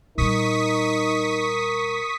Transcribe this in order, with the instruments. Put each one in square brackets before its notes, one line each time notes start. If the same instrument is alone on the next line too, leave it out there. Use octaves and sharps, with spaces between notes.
[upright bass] A#2 G3 [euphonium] D#4 [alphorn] A#4 [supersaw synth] C#6 D#6 B6